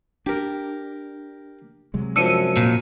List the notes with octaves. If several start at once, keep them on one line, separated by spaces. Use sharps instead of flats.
D4 G4 A#4
C3 F#3 G#3
F#2 F3 D4 E6 C#7 D#7
A#2